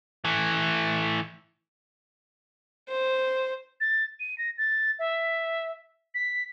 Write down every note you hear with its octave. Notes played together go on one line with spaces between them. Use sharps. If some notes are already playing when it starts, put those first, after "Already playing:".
E3 A3
C5
A6
D#7
A#6
A6
E5
B6